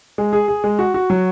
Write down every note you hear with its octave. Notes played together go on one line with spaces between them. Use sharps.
G#3
G#4
G#4
G#3
F#4
F#4
F#3